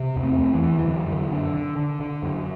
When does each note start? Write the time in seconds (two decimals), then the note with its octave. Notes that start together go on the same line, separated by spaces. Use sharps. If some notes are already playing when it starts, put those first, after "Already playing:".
Already playing: C3
0.16 E2
0.24 A3 C4
0.39 E2
0.54 E3
0.62 E2
0.79 E3
0.85 F#2 D3
1.08 F#2
1.32 D3
1.54 D3
1.76 D3
2.00 D3
2.23 F#2